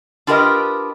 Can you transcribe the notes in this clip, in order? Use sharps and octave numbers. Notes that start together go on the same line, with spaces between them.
D4 F4 G4 A#4 B4 D#5